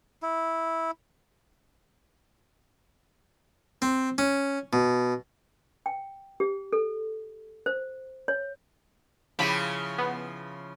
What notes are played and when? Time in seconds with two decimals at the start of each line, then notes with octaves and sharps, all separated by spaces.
0.23 E4
3.82 C4
4.18 C#4
4.73 B2
5.86 G5
6.40 G4
6.73 A4
7.66 C5
8.28 C#5
9.39 C#3 F3 E4 G4 B5 B6
9.98 B3